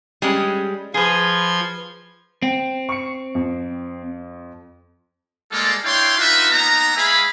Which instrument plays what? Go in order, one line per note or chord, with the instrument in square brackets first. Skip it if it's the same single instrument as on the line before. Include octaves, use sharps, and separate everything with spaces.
[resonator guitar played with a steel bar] G3 G#3 C#4
[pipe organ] F3 C6 G#6 [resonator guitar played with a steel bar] G#4 B4
[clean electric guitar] C4 [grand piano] G5
[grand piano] C#6 C#7
F2
[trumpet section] G3 G#3 A#3 F4 A4 D5
D4 E4 C#5 F5 G5 C6
D4 D#4 F4 F#4 B4 E5
A#3 B3 D#4 A#5
G#3 G#4 E5 F5 G#5 B5